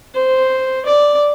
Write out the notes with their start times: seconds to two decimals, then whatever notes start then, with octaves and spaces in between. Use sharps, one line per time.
0.15 C5
0.85 D5